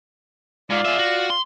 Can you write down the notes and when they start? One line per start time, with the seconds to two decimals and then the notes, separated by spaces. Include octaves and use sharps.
0.71 G#2 F4 D5
0.86 G#4 E5
0.99 F#4
1.30 C6